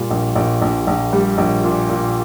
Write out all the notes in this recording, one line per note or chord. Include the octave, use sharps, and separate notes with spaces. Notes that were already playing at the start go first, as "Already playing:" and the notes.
Already playing: A#2 G3
A#1
A#1
A#1
A#1
G3
A#1
A#2
A#2